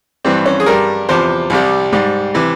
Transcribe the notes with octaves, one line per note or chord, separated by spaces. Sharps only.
G2 E3 G3 C4
C#4
G#4
G2 G3 A#4
E2 C3 F3 C5
C2 C3 G3
G#2 G3
C3 E3